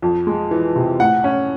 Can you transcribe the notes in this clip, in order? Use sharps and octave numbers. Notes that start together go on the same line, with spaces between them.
F2
G#3
E3
C3
A2 F#5
C#4